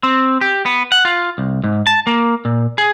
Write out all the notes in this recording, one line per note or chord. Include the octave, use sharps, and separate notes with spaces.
C4
G4
B3
F#5
F4
C2
G#2
A5
A#3
A#2
G#4